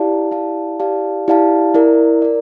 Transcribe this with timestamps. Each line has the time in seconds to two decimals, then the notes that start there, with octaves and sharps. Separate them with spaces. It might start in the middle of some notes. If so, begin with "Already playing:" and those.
Already playing: E4 G4 D5 F5 A5
0.31 E4 G4 D5 F5 A5
0.80 E4 G4 D5 F5 A5
1.28 E4 G4 D5 F5 A5
1.74 E4 A#4 D5
2.22 A#4 D5